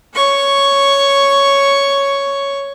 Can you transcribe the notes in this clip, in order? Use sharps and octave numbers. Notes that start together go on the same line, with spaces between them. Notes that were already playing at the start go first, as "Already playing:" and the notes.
C#5 C#6